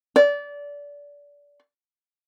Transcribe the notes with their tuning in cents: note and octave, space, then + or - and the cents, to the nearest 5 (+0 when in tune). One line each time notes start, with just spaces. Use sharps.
D5 -25